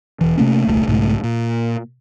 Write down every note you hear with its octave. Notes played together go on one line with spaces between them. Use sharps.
E1 E3
C3 A3 A#3 C#4
D#1 C2 D3 A3
B1 G#2 C#3 A3
A#2